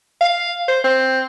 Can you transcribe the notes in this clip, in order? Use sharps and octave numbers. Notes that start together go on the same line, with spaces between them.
F5
C5
C4